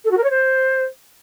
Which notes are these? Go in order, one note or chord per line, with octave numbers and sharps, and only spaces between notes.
A4
F#4
A#4
C#5
C5